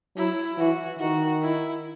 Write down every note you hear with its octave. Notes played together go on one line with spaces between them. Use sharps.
F#3 E4
E3 F#4
D#3 F#4
E4